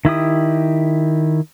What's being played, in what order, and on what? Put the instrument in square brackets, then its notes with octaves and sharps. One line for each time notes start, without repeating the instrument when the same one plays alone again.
[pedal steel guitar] D#3 E4 G4 D#6